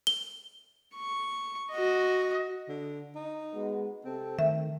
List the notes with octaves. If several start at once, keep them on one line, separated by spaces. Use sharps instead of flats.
G7
C#6
F#4 D#5
D3
D#4
G#3 B3 F#4
C3 C4 A4
D#3 A3 E5